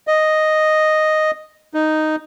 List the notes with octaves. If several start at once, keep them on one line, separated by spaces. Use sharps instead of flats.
D#5
D#4